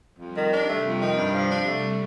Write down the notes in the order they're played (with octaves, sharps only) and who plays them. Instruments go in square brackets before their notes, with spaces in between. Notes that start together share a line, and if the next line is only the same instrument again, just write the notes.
[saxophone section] F2 [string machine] G3
[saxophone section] D#3
D4
[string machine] C3 [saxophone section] A3
[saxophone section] F2
D#3
G2
F3
D4
A3